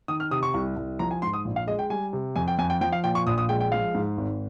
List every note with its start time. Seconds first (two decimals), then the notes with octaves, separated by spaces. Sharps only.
0.08 D#3 D#6
0.20 F6
0.31 C3 D#6
0.43 C#6
0.54 C2
0.77 C2
0.99 F3 A#5
1.11 G#5
1.22 G#2 C6
1.33 D#6
1.45 A#1
1.56 F5
1.67 G#3 D#5
1.79 G5
1.90 G3 G#5
2.13 C3
2.36 F2 G#5
2.48 G5
2.59 F2 G#5
2.70 G5
2.81 F3 G5
2.92 F5
3.04 A#2 G5
3.15 C#6
3.27 A#1 D#6
3.38 D#6
3.49 G#3 G5
3.61 G5
3.72 F3 F5
3.94 G#2
4.17 G#1